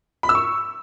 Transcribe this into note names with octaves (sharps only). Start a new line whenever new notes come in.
B5
E6
C#6